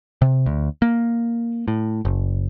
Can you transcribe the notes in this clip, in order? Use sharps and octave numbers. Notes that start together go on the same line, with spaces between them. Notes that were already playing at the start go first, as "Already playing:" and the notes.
C3
D2
A#3
A2
F#1